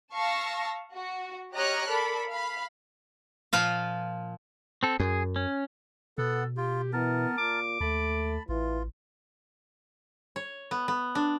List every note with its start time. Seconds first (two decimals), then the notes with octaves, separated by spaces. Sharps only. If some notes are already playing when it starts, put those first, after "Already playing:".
0.14 F5 A5 C#6 E6 A#6
0.94 F#4
1.55 G4 C#5 D#5 A#5 F6 F#6
1.88 A4 A#4 D5 B5
2.30 F5 B5
3.53 A#2 F3 F4 F5
4.83 C4 A4
5.00 F#2 G#4
5.36 C#4
6.18 B2 B3 A4 F#5
6.57 F4 G4
6.93 E3 B3 A#4 A5
7.38 A#2 D6
7.81 D#2 A3 A5 B5
8.49 A1 E3 F4
10.36 C#5
10.71 B3
10.88 B3
11.15 D4